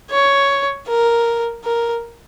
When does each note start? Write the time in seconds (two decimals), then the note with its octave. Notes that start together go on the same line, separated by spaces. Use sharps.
0.11 C#5
0.88 A#4
1.64 A#4